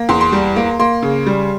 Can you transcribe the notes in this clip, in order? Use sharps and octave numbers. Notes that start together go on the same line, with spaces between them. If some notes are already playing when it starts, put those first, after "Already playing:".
Already playing: A#3
E2 C6
C6
G3
A#3
A#3 C6
C#3
G3